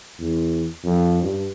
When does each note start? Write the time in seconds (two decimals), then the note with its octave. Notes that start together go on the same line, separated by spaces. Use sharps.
0.19 E2
0.84 F2
1.22 G2